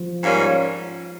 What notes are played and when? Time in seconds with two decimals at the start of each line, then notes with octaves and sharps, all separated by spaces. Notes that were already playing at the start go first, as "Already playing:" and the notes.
Already playing: F3
0.23 G#2 G3 A#3 C#4